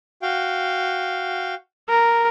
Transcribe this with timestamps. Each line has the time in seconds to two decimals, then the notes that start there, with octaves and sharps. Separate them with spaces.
0.22 F#4 F5 G5
1.89 A#4